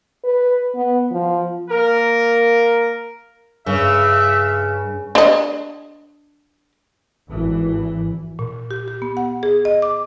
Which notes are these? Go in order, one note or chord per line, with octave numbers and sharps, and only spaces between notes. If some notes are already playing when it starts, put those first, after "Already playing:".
B4
B3
F3
A#3 A#4
G2 C#3 E5
D4 D#5
G#1 E3
A#2
G4
G4
B3
F#5
G#4
D#5
D6